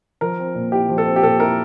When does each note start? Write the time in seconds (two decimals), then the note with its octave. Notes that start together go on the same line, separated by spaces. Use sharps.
0.21 F3 A#4
0.39 C4
0.55 A#2
0.72 E4 G4
0.89 F3
0.98 A4
1.06 C4
1.16 G4
1.23 A#2 A4
1.40 E4 A#4